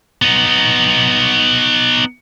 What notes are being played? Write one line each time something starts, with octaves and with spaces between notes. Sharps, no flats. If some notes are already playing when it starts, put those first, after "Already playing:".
B3 D#4